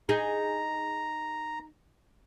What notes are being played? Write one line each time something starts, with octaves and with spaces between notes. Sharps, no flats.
D#4 G#4 A#5